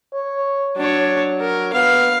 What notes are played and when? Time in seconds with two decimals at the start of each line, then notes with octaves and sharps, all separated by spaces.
0.14 C#5
0.77 F#3 D4 C#5
1.41 A#4
1.73 B3 F5